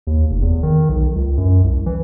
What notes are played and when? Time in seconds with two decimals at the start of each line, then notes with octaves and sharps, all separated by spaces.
0.07 D#2
0.30 F1
0.42 E2
0.63 D#3
0.89 B1
1.15 C#2
1.37 F#2
1.64 C2
1.86 E3